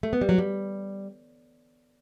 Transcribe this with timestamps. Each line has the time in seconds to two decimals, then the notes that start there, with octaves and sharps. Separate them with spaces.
0.03 A3
0.13 B3
0.21 G3
0.29 F#3
0.38 G3